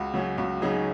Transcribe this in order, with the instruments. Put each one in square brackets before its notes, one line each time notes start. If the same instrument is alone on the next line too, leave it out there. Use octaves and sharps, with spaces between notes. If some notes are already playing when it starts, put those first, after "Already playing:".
Already playing: [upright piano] C#2 F#4
C#3 F#3 C#4
C#2 F#4
C#3 F#3 C#4 D#4 G#4